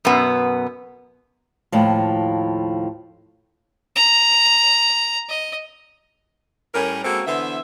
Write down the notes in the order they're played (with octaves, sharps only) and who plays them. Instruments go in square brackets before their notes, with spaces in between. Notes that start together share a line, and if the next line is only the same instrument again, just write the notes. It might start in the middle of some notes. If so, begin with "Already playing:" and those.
[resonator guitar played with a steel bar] F#2 B2 B3
[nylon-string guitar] D#2 A2 F3
[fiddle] A#5
D#5
[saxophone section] A2 G3 C#4 A#4
G#3 A#3 C4 C#4 F#4 A4
D3 E3 B3 C5 E5